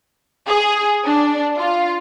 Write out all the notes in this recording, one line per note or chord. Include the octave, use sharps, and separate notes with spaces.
G#4
D4
F4